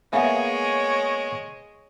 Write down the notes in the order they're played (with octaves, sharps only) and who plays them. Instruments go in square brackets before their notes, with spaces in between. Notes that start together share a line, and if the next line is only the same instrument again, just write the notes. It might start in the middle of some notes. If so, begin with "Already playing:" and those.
[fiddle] G#3 [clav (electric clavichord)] A#3 B3 G#4 [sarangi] C#5 [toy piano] E5 F5